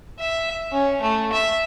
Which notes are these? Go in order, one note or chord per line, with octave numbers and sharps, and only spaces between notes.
E5
C#4
A3
E5